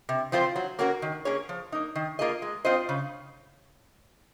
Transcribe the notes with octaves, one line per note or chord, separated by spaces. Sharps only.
C3
F3 C4 F4 C5
F#3
A#3 C#4 F#4 A#4
D#3
A#3 C#4 G#4 C#5
F3
A#3 D#4
D#3
A#3 F4 G#4 D#5
G#3
C4 F4 C5 D#5
C#3